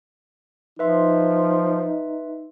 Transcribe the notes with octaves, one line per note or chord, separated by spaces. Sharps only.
F3 D#4 B4 E5 C6